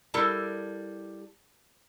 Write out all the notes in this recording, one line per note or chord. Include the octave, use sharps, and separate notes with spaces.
G3 E4 A4 A#4 A5